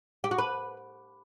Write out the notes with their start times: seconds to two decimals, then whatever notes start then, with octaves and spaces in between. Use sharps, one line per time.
0.24 G4
0.31 F#4
0.38 B4